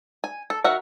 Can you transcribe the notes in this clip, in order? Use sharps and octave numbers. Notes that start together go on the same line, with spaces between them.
G#5
A4
D#3 F#4 A#4 E5 F#5